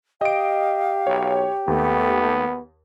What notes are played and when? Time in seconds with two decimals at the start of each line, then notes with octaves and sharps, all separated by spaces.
0.21 G4 D#5 F5 D7
1.07 B1 C#5
1.68 D#2 A3 B3